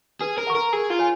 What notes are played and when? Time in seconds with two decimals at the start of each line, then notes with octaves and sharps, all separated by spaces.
0.21 G#4 B4
0.38 A#4
0.47 F#5 A#5 C#6
0.55 A#4
0.73 G#4 A#4
0.90 F4
0.99 C#5 G#5